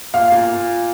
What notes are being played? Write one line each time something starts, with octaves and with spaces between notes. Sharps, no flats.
A#2 F5
A#2